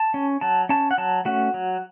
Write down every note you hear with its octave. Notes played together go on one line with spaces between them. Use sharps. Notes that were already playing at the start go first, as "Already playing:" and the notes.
Already playing: A5
C#4
F#3 A5
C#4 A5
F#5
F#3 A5
A3 C#4 F#4
F#3